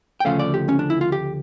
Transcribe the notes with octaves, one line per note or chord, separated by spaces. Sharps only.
G5
D2 C#3 F3 A3 C#4 F5
D5
G4
C#4
D4
E4
F4
G4